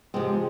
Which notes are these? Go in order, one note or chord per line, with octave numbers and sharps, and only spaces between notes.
C3 F3 G#3 C4